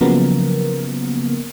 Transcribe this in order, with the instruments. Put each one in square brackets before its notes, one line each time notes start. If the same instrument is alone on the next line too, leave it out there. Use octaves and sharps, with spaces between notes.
[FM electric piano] C#3 F3 F#3 A#3 B3 A#4